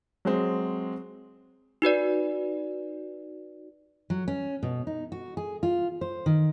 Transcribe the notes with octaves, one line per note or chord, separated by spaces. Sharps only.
F#3 G#3 C4
D#4 F#4 B4 D5
F#3
C#4
B2
D#4
F#4
G#4
F4
C5
D#3